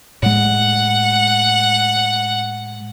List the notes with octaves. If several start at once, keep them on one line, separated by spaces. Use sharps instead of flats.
A2 G#3 F#5